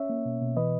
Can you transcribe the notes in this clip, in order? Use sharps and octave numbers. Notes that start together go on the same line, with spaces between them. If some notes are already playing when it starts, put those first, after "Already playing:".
Already playing: C#4 C#5 E5
A#3
B2
B2
E3 B4 D#5